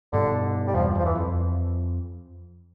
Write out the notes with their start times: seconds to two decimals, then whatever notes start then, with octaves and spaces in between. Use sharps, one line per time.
0.13 G2 B2 D3
0.67 G3
0.75 E2 G2 F3
0.95 E2 F3
1.05 E3
1.15 F2